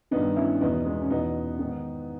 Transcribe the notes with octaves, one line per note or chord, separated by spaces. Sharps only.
G2 D#3 B3 D#4
C#4 E4
E2 B2 B3 D#4
G#3 B3
C#4
E2 B2 B3 D#4
G#2 D#3